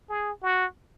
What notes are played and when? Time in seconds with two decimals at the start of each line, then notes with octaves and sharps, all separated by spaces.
0.09 G#4
0.42 F#4